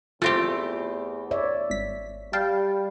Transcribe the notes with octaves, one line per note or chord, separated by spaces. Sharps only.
E2 A3 C4 F4 G4
C#5 D5 E5
G#1 B6
G3 F5 G5 A5